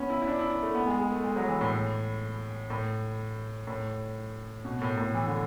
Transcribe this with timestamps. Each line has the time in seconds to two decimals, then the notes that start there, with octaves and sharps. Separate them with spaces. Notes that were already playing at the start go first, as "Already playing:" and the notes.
Already playing: B3 C#4
0.10 E4
0.22 E4
0.27 D4
0.39 E4
0.50 E4
0.63 A3
0.75 B3
0.87 G#3
0.99 G#3
1.12 A3
1.24 G#3
1.36 F#3
1.48 E3
1.61 A2
2.70 A2
3.67 A2
4.65 B2
4.82 A2
4.97 A2
5.15 E3
5.27 D3